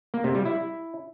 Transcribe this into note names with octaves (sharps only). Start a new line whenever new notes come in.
A#3
C3
G3
E4